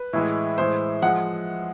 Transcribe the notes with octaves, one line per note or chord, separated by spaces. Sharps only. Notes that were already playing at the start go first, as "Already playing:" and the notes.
Already playing: B4
A2 E3 G#3
A2 E3 G#3 C5
F3 G#3 F#5